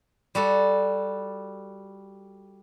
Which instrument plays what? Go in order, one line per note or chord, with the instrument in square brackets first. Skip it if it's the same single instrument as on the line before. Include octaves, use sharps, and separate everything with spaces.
[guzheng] G3 F#4 A4